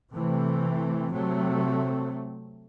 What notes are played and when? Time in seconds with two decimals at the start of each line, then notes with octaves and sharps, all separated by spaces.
0.12 C3 E3 A3 C4
1.11 C3 F#3 A3 C4